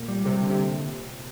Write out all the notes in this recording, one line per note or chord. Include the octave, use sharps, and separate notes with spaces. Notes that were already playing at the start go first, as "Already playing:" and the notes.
Already playing: A#2
G3
C3 G3
D3
C3